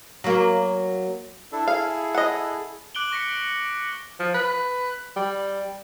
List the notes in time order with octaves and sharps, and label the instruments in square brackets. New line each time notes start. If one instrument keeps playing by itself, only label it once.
[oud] F#3 A#3
[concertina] D4 E4 A4
[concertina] E4 G#4 A4 [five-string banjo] F5
[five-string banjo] D#5 F#5
[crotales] D6 F#6 D7 F#7 G7
C#6 A#6 B6 C#7 G7
[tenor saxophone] F3
B4
G3